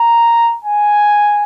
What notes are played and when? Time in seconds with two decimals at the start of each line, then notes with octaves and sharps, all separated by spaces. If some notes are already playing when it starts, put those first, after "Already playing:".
Already playing: A#5
0.64 G#5